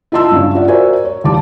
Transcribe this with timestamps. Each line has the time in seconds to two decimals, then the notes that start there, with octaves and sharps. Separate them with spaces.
0.12 E4 F4 D#5 A5 C6 E6
0.31 G2 C#3 C#4
0.55 F4 D5 E5 F#5
0.68 F#4 A#4 C5 D5 E5 G#5
1.05 C#5
1.24 D#2 D#3 E3 G3 A5 D6